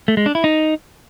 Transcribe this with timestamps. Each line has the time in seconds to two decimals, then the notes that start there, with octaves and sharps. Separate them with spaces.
0.08 A3
0.17 G#3
0.26 D4
0.35 E4
0.44 D#4